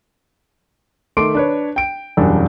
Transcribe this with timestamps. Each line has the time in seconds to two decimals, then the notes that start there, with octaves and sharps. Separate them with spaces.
1.17 D#3 A3 C6 D6 D7
1.35 D4 B4 C#5
1.76 G5 D7
2.17 E1 F#2 G3 D4